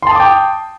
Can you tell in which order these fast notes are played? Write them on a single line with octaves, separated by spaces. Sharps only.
C6 A5 D#6 D6 G5